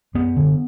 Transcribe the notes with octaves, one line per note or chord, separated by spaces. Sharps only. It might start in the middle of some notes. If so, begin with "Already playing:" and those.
F#2 B3
D3